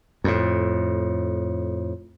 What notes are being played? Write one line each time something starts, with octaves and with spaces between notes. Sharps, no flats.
F2 A2